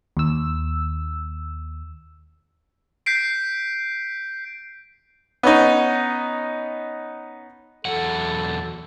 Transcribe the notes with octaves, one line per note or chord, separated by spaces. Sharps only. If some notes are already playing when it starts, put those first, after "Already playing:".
D#2 E6
G6 B6 C7 D7
B3 C#4 D#4
E2 F#3 A4 F#5